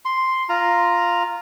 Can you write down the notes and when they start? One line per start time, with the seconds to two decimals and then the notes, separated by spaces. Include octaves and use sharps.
0.05 C6
0.49 F4 A#5